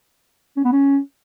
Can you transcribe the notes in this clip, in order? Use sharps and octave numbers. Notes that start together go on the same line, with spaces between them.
C#4
B3
C#4